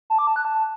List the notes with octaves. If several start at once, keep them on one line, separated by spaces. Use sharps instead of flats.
A5
D6
A5
F#6
A5